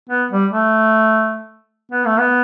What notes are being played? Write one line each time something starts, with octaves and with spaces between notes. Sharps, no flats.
B3
G3
A3
B3
A3
B3